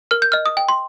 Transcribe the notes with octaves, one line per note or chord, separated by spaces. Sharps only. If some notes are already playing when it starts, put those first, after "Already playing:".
A#4 F6
G6
D#5 F6
D#6
G5
C6